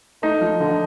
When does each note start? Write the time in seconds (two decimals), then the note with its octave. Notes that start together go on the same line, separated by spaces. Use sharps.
0.22 A3 D#4
0.41 F3
0.60 D3